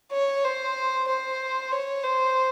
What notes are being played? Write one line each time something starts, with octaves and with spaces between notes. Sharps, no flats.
C#5
C5
C5
C#5
C5